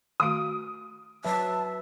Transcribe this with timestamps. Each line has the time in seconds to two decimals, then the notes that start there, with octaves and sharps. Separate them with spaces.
0.20 D#3 A3 F#4 D#6 D7
1.25 F#3 B4 E5 A5